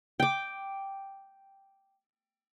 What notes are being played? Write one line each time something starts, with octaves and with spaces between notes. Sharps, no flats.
G5 D6